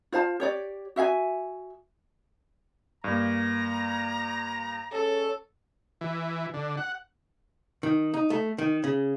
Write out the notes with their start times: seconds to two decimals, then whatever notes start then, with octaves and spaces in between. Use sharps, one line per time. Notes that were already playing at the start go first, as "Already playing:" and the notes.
0.12 F4 C5 F5 A5
0.40 G4 C#5 D5
0.96 F#4 E5 F5 G#5
3.04 G2 A#3 A#5
4.92 C#4 G#4 A4 C#5
6.01 E3
6.54 D3
6.77 F#5
7.83 D#3
8.14 D#4
8.30 A3
8.58 D#3
8.84 C#3